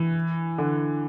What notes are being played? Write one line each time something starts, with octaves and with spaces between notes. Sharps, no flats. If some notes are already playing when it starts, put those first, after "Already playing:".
Already playing: E3
D3